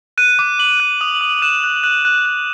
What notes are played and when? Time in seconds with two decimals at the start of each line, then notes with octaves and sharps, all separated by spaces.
0.18 F#6 D#7
0.39 D6
0.59 D6 F#7
0.80 F#6
1.01 D#6 F7
1.21 D#6
1.42 F#6 E7
1.64 F#6
1.84 F#6
2.05 F#6
2.25 F#6